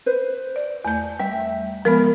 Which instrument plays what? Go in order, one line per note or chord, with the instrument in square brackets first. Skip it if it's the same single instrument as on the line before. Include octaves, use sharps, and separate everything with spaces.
[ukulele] B4 C5
[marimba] D5
E2 A3 G6
[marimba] G3 [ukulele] E5 G5
[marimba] F3 G#3 B3 [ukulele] A#4